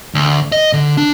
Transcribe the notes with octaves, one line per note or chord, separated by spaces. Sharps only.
D2
D#5
D3
D4